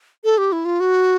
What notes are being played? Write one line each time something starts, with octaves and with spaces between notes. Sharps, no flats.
A4
G4
E4
F4
F#4